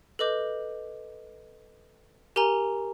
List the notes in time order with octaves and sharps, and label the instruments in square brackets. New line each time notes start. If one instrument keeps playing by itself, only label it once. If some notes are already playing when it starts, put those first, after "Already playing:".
[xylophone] A4 B4 D#5 D6 G6
G4 A#4 G#5 A#5